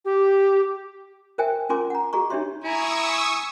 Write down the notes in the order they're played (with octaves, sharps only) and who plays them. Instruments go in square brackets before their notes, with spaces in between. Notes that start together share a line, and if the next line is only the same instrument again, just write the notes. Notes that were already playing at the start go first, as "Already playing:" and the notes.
[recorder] G4
[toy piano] A#4 C5 E5 G5 G#5
C#4 F4 A#4 G#5 C6 D6
F#5 A#5
F#4 G#4 D#5 A#5 C#6
D4 D#4 G4 C#5 E5 C6
[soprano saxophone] E4 [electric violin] G#5 A#5 [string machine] C#6 D#6 E6
[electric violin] G#5